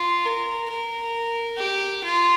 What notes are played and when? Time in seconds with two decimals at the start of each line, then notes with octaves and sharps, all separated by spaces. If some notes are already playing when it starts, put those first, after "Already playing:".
Already playing: F4
0.25 A#4
0.70 A#4
1.58 G4
2.03 F4